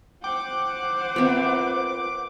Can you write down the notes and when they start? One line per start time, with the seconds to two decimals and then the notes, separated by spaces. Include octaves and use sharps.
0.24 C5 F#5 G5 D6
1.16 B3 C4 F4 A#4 E5